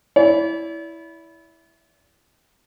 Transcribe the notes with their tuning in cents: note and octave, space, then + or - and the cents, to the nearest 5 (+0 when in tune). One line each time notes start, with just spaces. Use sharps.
E4 -5 D5 -40